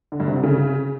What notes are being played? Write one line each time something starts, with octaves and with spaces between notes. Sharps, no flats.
D3
G2
C3
D3
C#3